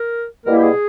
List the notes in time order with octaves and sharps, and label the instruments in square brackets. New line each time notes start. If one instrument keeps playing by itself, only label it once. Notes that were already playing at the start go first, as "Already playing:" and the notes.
Already playing: [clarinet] A#4
[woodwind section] B2 G3 A#3 E4 [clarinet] A#4
[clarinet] G4
G#4